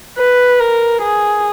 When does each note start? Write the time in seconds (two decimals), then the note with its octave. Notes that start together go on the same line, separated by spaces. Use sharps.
0.18 B4
0.60 A#4
1.02 G#4